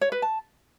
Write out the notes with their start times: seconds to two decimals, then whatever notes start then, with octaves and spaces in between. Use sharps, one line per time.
0.01 C#5
0.12 B4
0.22 A5